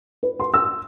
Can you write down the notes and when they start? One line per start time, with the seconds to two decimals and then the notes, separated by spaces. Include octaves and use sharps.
0.23 B4
0.40 C6
0.54 E6